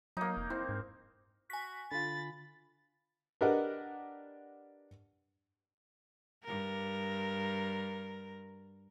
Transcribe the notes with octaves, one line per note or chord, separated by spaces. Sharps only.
F#3 A#3 D#4
F1
C4 E4
G#2
F#4 G#5 B6
D3 F4 B5 A6
D4 G4 A#4 B4 D#5 F#5
G2 A#4